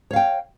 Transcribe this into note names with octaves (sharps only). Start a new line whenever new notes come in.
C#5 F5 G5